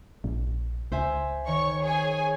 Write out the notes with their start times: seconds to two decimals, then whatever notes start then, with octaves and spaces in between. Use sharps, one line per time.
0.24 A#1
0.92 C#2 C5 E5 G#5
1.47 D#3 C#5 C#6
1.84 G#4 C#5 G#5